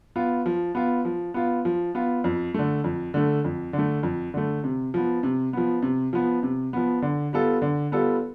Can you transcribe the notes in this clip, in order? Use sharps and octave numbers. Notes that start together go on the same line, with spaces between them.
B3 F4
F3
B3 F4
F3
B3 F4
F3
B3 F4
F2
D3 A3
F2
D3 A3
F2
D3
A3
F2
D3 A3
C3
F3 B3
C3
F3 B3
C3
F3 B3
C3
F3 B3
D3
G3 B3 F4 A4
D3
G3 B3 F4 A4